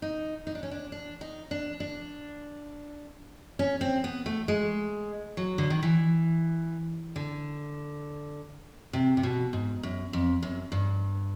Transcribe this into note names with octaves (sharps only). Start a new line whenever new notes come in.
D#4
D#4
D4
C#4
D4
D4
D#4
D4
D4
C#4
C4
B3
A3
G#3
F#3
D3
D#3
E3
D3
C3
C3
B2
G#2
F#2
F2
F#2
G2